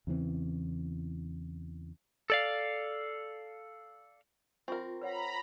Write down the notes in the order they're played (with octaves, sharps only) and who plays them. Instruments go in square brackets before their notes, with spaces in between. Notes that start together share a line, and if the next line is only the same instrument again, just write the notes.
[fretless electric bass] E2 C#3 E3 C4
[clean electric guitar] A4 D5 F5
[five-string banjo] C4 A#4 [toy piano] F4 C#6
[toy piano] B4 C#5 F#5 [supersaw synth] A#5 B5